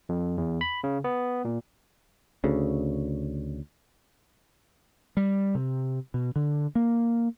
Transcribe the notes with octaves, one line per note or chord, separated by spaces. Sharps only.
F2
E2
B5
C#3
B3
A#2
D2 C#3
G3
C3
B2
D3
A#3